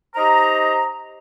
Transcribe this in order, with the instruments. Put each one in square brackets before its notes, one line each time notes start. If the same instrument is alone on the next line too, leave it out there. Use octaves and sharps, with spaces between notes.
[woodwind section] D#4 G4 C5 D#5 A#5